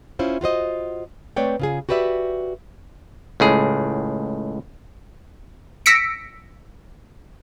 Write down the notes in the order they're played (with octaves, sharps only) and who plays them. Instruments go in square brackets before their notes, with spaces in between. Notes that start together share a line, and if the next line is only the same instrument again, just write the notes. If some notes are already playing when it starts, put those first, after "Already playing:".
[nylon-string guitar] C#4 E4 F4 C5
F4 F#4 C5 D#5
A3 C4 B4 C#5 D5 G5
C#3 F4 G#4
F#4 G4 B4 D5 E5
[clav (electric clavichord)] C#2 A2 G#4
[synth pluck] E6 A#6 B6 C#7 D7